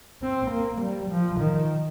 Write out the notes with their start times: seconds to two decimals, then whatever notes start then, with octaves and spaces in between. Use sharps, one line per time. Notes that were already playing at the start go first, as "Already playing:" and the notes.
0.23 C4
0.51 A#3
0.81 G3
1.11 F3
1.40 D#3